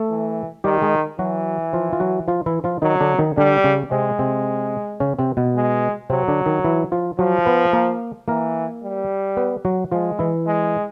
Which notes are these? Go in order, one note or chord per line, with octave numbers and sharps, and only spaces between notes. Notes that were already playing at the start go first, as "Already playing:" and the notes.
Already playing: A3 A4
E3
D#3 G3 G4
G#3 G#4
E3 F#3 F#4
F3 F4
F4
F#3 F#4
F3 F4
E3 E4
F3 F4
D#3 F#3 D#4
D3 D4
D#3 D#4
D3 G3 D4
C#3 C#4
C3 G#3 C4
C3 C4
C#3 C#4
C3 C4
B2 B3
G#3
C3 F#3 C4
D3 D4
D#3 D#4
E3 E4
F3 F4
F3 F#3 F#4
B3 B4
A#3 A#4
E3 A#3 A#4
G3
B3 B4
F#3 F#4
F3 G#3 F4
E3 E4
G#3